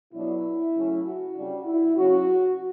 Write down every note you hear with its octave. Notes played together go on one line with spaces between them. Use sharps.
B2 F#3 B3 D4 E4
C#3 F#3 A3 C#4
F#4
C#3 G3 D4
E4
C#3 F#3 C#4 F#4